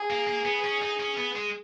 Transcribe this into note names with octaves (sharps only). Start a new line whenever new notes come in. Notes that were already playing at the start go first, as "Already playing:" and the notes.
Already playing: G#4
A#3
A#3
B3
C#4
D#4
C#4
B3
G#3